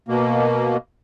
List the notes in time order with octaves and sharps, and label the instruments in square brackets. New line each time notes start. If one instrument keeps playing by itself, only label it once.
[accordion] B2 A#3